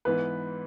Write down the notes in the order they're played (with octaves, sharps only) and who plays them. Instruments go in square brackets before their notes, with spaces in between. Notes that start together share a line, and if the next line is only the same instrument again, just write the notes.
[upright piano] G#2 E3 B3 [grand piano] B4